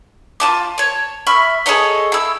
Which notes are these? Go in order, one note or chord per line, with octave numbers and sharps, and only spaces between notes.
F4 A5 D6
C#5 A5
E5 B5 C#6 F6
G#4 A4 C#5 D#5
E4 E6